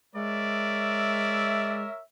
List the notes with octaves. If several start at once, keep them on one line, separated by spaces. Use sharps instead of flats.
G#3 A#4 C#5 D5 E5